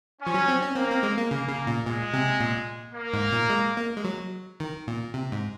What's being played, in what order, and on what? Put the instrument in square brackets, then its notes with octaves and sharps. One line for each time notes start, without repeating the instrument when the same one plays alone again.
[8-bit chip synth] F3 [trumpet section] C#4
[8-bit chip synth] F#3
C4
C#4
[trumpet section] A#3 [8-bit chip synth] C4
[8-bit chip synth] C4
G#3
A#3
[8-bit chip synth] C#3 [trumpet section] A#3
[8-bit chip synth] C#3
A#2
[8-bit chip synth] A#2 [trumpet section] G#3
[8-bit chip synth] C3
A#2
[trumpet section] A#3
[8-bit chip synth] G#2
A#2
G#3
A#3
G#3
F#3
D#3
A#2
C3
G#2